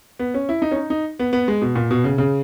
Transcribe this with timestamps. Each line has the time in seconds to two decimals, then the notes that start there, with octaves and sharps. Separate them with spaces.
0.19 B3
0.34 C#4
0.49 E4
0.62 D#4
0.71 C#4
0.76 D#4
0.90 D#4
1.20 B3
1.33 B3
1.48 G#3
1.62 B2
1.76 A#2
1.91 B2
2.04 C#3
2.18 C#3